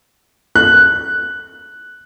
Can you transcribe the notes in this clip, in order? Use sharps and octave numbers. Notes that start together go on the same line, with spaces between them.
F#6